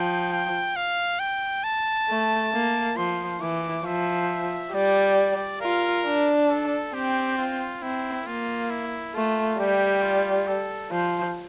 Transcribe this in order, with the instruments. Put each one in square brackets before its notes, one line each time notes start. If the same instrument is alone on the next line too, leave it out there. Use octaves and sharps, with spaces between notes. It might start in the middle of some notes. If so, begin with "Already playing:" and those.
Already playing: [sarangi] F3 [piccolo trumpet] G5
[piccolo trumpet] G5
F5
G5
A5
[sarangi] A3
A#3
[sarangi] F3 [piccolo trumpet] C6
[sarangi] E3 [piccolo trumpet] D6
[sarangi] F3 [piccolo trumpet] E5
[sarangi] G3 [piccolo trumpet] D5
[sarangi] F4 [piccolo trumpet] A#4
[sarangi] D4
[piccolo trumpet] A4
[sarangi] C4 [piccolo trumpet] G4
[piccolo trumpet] F4
[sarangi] C4 [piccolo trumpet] E4
[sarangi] A#3 [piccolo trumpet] F4
[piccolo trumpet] E4
[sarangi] A3 [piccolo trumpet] F4
[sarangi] G3 [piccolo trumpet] G4
[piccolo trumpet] F4
A4
[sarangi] F3 [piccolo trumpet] C5